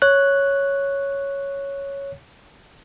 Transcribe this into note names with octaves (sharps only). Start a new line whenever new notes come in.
C#5 F#6